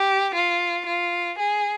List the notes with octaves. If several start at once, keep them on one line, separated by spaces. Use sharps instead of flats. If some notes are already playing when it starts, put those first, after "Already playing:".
Already playing: G4
F4
F4
G#4